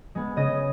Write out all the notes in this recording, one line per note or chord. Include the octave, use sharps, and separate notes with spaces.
G#3 B3
C#3 D#5